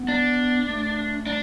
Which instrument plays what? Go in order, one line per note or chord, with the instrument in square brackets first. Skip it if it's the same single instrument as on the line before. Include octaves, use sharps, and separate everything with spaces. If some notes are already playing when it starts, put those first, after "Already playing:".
Already playing: [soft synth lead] B3
[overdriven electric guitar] D4
[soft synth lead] A3
[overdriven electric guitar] D4